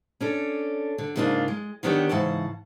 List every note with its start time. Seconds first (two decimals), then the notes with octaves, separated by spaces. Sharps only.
0.20 C#4 D4 A4
0.98 D3
1.16 G#2 C#3 A#3 B3 D4 F4
1.48 G#3
1.83 D3 D#3 B3 D4 G4 C#5
2.09 G#2 C#3 E3 F#5 A5